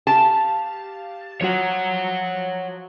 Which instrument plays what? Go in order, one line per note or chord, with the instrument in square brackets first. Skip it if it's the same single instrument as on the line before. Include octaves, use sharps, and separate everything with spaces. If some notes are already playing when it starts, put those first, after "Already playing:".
[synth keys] G4 F5 [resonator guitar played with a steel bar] A5
[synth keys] F3 F#3 F#4 [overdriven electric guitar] C#5 F#5